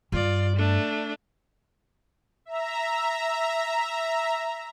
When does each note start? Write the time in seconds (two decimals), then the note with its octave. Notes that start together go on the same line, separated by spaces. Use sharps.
0.12 G2 F4 D5
0.56 A3 D4
2.45 E5 A#5